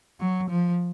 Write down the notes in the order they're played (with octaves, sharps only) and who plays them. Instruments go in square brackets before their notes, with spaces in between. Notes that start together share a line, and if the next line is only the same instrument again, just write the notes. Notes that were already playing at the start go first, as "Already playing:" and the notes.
[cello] F#3
F3